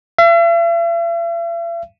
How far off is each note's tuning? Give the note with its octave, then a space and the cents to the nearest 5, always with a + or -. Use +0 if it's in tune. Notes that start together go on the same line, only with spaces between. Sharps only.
E5 +45